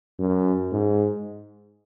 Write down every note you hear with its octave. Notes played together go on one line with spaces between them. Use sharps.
F#2
G#2